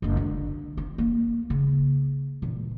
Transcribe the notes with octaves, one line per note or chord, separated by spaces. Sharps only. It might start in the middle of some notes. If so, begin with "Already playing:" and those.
F#1 C#2
D3
C4
A#3
C#3
A#2 E3